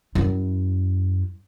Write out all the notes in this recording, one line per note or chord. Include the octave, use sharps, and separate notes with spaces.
F#2 E4